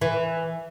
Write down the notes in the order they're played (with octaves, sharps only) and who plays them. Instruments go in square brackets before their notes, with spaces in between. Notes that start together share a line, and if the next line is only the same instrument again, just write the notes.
[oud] E3